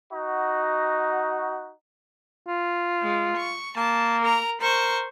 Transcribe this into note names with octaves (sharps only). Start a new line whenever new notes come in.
D#4 F#4
F4
G#3
C#6
A#3 A5
A#4 A#5
A#4 C5 C#6